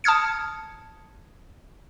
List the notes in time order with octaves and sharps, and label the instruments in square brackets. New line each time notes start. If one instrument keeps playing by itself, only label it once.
[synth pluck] A5 D#6 F6 G#6 C#7